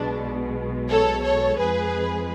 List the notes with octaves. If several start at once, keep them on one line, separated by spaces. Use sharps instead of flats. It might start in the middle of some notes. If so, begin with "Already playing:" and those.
Already playing: B1 B2 G#3 D4
A4 C#5
A4 C#5
F2 F3 G#3 G#4 B4